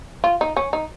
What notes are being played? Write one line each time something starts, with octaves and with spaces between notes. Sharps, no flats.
F4
D#4
C#4
D#4